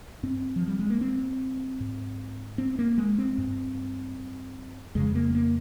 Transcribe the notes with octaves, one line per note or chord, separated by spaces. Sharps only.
G2 C4
F3
G3
G#3
A#3
C4
G#2
C4
A#3
G#3
C4
G2
F2 C#3 G#3
A#3
A#3